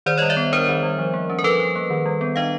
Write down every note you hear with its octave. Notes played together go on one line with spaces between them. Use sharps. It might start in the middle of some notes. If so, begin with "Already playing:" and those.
D#3 C5 D5
G3 C#5 D#5
D5 E5
B3
D4 A#4 C5
D#3
G3
F3
A#3
C#4
A#4
F3 A4 B4
F3
A#3
D#3
G3
B3
D4 D#5 F5